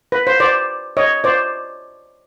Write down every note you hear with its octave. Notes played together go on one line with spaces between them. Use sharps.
B4
C5
C5 D5
C#5 D#5
C5 D5